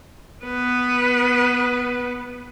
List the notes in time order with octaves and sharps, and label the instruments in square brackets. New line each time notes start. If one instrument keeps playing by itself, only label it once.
[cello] B3 B4